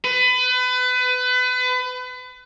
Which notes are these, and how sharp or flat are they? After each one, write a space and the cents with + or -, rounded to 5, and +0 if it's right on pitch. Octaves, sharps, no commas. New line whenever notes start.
B4 +30